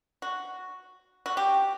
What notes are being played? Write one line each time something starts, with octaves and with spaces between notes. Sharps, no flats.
F#4
F#4
G4